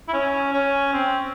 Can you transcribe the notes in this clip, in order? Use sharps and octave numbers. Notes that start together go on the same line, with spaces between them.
E4
C#4
C#4
C4